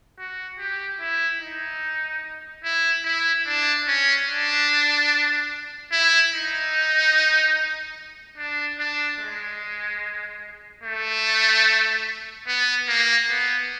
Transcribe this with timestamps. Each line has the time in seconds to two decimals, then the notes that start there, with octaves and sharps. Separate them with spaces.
0.19 F#4
0.59 G4
1.00 E4
1.41 D#4
2.64 E4
3.04 E4
3.46 D4
3.88 C#4
4.28 D4
5.92 E4
6.33 D#4
8.38 D4
8.79 D4
9.20 G#3
10.83 A3
12.47 B3
12.88 A#3
13.30 B3